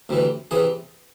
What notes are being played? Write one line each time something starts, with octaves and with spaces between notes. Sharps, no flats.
D2 C3 E3
C3 E3 G#4